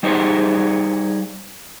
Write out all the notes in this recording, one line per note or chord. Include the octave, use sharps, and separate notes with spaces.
G3 D#4 G#4 C5 C#5